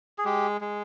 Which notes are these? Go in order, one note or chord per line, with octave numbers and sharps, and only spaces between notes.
G#4
G#3 G4
G#3